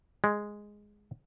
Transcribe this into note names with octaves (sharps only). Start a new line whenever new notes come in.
G#3